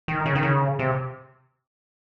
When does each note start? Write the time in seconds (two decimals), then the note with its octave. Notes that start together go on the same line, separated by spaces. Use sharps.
0.08 D#3
0.26 C#3
0.35 D#3
0.43 C#3
0.79 C3